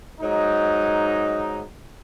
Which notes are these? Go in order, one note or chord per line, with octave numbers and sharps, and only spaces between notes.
G#2 F#3 D#4